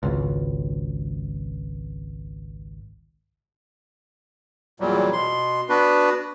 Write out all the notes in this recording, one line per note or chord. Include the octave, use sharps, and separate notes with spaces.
G#1 C#2
E2 A#2 F#3 G3
B2 C6
B3 D4 F#4 B4